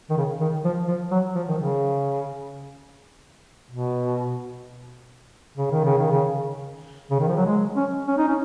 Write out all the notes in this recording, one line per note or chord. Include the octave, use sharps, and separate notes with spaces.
D#3
C#3
D#3
F3
F3
F#3
F3
D#3
C#3
B2
C#3
D#3
C#3
D#3
C#3
C#3
D#3
F3
F#3
G#3
C#4
C#4
D#4
C#4